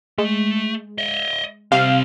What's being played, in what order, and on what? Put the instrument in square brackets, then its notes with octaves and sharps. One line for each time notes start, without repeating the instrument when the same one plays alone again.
[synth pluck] G#3 [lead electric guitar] A3
[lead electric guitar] D#5 E5
[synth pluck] C3 [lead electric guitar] G3 C4 [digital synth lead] F5